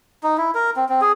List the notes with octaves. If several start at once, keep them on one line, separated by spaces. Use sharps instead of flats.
D#4
E4
A#4
C4
C4
G#4